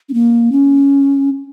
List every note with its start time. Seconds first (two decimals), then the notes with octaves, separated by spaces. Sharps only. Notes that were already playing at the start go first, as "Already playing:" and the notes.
0.09 C#4
0.14 A#3
0.52 C#4